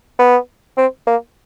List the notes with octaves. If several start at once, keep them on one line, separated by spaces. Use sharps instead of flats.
B3
C4
A#3